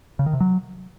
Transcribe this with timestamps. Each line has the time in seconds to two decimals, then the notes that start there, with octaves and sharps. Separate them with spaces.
0.19 C#3
0.26 D#3
0.33 C3
0.40 F#3